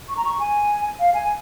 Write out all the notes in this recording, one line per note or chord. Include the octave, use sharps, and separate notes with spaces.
C#6
A#5
C#6
G#5
F5
G#5